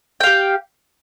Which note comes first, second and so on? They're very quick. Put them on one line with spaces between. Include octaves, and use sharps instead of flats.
G5 F5 G4